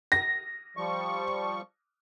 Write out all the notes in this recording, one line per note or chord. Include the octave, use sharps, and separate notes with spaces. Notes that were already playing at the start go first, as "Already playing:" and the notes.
A#6
F3 G3 C#6